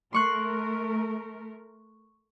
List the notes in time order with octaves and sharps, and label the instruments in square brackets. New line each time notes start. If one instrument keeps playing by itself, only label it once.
[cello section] A3 A#4 [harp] C6 C#6 F#6